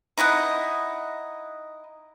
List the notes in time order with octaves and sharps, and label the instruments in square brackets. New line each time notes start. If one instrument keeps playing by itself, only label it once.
[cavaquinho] D#4 E4 D#5 F#5